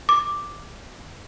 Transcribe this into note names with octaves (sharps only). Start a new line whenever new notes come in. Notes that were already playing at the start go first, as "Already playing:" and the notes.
D6